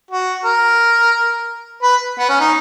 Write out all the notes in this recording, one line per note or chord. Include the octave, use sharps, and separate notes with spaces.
F#4
A#4
B4
B3
C#4
D#4